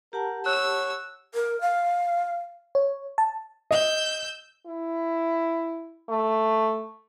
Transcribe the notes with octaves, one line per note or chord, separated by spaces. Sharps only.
G4 A#4 F#5 A5
C#5 E6 F#6
A#4
F5
C#5
A5
D#5 E6 G6
E4
A3